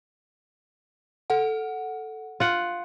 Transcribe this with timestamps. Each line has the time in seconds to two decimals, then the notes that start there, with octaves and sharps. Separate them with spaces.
1.30 A4 F#5
2.40 F4 F#5